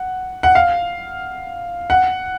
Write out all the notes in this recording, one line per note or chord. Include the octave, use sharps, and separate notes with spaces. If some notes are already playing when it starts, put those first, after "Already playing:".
Already playing: F#5
F#5
F5
F#5